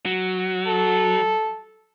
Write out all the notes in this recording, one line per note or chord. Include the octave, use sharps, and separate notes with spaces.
F#3
A4